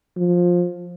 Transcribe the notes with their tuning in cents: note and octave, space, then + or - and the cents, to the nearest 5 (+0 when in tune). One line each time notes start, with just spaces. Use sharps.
F3 +15